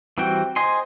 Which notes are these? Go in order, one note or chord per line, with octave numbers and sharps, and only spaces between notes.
E3 G3 C4 F#4 G5
C5 D#5 G#5 C6